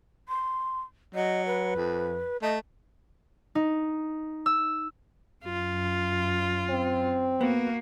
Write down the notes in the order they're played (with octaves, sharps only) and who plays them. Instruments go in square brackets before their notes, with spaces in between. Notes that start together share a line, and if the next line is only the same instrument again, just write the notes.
[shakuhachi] C6
[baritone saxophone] F#3 [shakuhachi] D#5
[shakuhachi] B4
[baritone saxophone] F2
[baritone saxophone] A3 [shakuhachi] D#5
[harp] D#4
E6
[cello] F#2 [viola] F4
[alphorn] C4
[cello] A#3 F#4 [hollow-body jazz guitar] B3